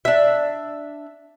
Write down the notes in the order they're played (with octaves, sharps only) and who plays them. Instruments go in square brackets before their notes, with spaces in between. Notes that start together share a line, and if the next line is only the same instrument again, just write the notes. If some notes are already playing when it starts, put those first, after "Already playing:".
[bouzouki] D4 E5